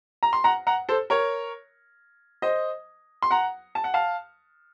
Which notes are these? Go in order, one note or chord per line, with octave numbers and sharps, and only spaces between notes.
A#5
C6
F#5 A#5
F#5 A#5
A4 C5
A#4 C#5
C5 D#5
C6
F#5 A#5
A5
F#5
F5 A5